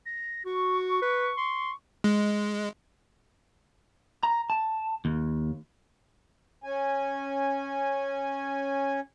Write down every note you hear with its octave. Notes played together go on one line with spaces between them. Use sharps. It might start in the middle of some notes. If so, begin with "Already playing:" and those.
A#6
F#4 C#6
B4
C6
G#3
A#5
A5
D#2
C#4 G#5